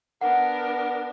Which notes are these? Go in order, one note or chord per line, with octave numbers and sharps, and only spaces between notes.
B3 D4 A#4 F#5